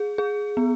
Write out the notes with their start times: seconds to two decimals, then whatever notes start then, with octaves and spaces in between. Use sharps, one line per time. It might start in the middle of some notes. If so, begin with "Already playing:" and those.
Already playing: G#4
0.18 G#4
0.57 B3